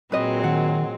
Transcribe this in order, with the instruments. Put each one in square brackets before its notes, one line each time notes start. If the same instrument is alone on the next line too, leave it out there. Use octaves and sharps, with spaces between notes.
[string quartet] A#2 F#3 G#3 [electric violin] C4 [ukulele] B4 D#5
[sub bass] D#3 [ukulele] F#5